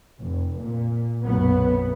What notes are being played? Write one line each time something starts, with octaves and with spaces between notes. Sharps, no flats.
F1
A#2
B1 F#2 B3